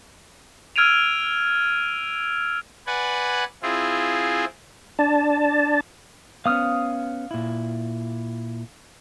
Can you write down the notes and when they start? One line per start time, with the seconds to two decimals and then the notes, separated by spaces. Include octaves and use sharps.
0.76 E6 F6 G#6 D7 D#7 F7
2.87 B4 D5 F#5 G#5
3.63 C4 E4 F4 G#4
4.99 D4 A5
6.46 B3 C#4 F5 D#6 F6
7.31 A#2 E4